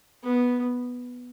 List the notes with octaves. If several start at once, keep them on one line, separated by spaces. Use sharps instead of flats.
B3